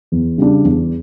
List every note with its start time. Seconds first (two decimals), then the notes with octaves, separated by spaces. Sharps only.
0.12 E2
0.38 C#3 G3 D4
0.64 E2